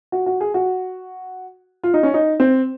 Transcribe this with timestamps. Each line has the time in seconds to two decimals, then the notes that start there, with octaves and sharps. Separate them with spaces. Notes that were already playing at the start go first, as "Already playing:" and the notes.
0.12 F#4
0.26 F#4
0.40 G#4
0.54 F#4
1.84 F4
1.94 D#4
2.03 C#4
2.14 D#4
2.40 C4